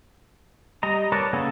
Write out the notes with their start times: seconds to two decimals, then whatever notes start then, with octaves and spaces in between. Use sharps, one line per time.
0.83 G3 D#5 A#5
1.12 A#4 B4 C#5 D5 A5
1.33 C#3 A#3 B3 G#4 A4